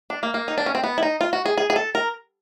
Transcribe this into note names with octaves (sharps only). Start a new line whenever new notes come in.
D4
A#3
A#3
D#4
D4
C#4
C4
B3
E4
D#4
F4
F#4
G#4
G#4
G#4
A4
A#4